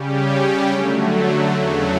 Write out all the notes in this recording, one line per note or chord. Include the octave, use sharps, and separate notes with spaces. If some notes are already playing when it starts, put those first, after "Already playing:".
Already playing: C#3 G3 C#4 G4
D3 F#3 A3
E2 C#3 F#3 A3